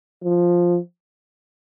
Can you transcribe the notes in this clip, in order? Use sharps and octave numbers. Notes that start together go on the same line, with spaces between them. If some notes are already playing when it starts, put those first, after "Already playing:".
F3